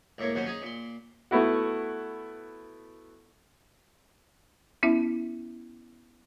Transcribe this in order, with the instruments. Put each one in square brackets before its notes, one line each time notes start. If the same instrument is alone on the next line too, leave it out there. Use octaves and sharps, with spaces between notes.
[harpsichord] C#2 A2 A#3 C#5
D#2 B2 F#3 C#4 C5
C#4 D#4 G#4
A#2 C6
[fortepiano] A3 B3 E4 F#4
[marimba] B3 C#4 E4 E5